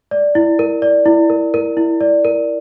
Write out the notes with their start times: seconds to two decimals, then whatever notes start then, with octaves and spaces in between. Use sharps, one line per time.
0.11 D5
0.35 E4
0.59 A#4
0.82 D5
1.06 E4
1.30 A#4
1.54 A#4
1.77 E4
2.01 D5
2.25 A#4